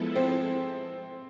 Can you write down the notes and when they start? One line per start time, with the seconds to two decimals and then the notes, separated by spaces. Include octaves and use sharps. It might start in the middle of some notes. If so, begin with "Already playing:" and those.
Already playing: F3 G#3 B3 E4 A4
0.16 C4